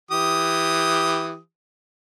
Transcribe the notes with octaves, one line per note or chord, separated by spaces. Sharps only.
E3 G4 D#6